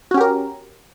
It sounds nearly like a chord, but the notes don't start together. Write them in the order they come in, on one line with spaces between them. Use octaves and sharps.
F#4 C#4 G4 A#4